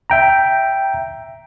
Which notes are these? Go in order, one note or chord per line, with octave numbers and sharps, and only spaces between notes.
E5 G5 A#5